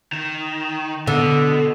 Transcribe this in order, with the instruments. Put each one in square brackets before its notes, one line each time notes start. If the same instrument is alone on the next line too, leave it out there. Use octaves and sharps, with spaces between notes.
[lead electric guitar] D#3
[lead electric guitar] B2 [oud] D3